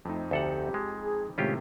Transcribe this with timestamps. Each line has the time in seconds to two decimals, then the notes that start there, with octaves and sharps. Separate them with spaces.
0.05 F2 A3 C4 D#4
0.31 D2 G4 A4 F#5
0.74 G#3
1.01 G#4
1.38 A2 C3 D#3 G#3 C#4 F4 G4